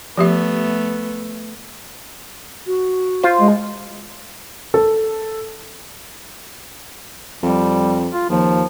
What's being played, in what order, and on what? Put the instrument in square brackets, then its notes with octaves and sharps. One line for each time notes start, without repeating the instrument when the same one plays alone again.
[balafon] F3 G4 E5 [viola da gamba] A3 B3
[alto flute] F#4
[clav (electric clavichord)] F4 C5
[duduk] G#3
[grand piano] A4
[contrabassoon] F2 [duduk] G3
[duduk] F4
[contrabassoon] D#2 [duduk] F3